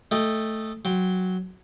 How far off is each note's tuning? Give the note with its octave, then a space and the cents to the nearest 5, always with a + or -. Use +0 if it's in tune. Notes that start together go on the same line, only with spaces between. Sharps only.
A3 +0 D#5 +0 G5 +20
F#3 +0 G5 +5 C6 +0